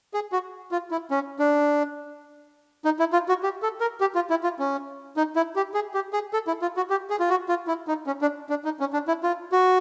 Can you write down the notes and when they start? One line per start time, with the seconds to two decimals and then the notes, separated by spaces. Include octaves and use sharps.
0.14 G#4
0.32 F#4
0.72 F4
0.91 E4
1.11 C#4
1.39 D4
2.85 D#4
2.99 E4
3.13 F4
3.29 F#4
3.43 G4
3.62 A4
3.81 A#4
4.01 G4
4.15 F4
4.30 E4
4.43 F4
4.59 C#4
5.17 D#4
5.36 E4
5.56 G4
5.74 G#4
5.94 G4
6.13 G#4
6.33 A4
6.47 E4
6.62 F4
6.77 F#4
6.90 G4
7.10 G#4
7.20 F4
7.30 F#4
7.49 F4
7.67 E4
7.88 D#4
8.07 C#4
8.22 D4
8.50 D4
8.65 D#4
8.80 C#4
8.93 D4
9.08 E4
9.23 F4
9.52 F#4